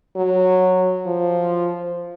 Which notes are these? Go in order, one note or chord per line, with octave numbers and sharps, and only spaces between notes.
F#3
F3